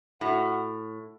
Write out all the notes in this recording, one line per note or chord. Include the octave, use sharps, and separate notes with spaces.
A2 F#4